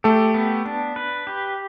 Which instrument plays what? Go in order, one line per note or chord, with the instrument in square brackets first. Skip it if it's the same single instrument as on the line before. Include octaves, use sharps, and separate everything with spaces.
[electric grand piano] A3 A4 [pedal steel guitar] G4
[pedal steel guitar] B3
D4
B4
G4